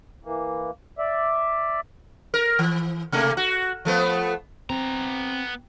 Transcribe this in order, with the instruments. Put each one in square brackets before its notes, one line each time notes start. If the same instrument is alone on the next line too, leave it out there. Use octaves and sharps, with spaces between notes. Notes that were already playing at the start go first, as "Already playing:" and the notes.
[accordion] E3 A#3
D5 E5
[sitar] A#4
E3
C3 A3 A#3
F#4
F3 A3 B3
[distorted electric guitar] B3 A#5 [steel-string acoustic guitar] C4